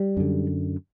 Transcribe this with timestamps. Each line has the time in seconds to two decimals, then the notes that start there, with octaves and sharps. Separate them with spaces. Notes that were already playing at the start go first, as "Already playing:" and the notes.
Already playing: G3
0.17 F#2 D3